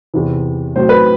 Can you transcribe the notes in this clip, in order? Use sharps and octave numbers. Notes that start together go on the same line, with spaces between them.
E2 C3 E3
A2 F#3 C4 C5
B4